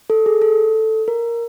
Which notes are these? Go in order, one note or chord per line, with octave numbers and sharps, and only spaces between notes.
A4
G#4
A4
A#4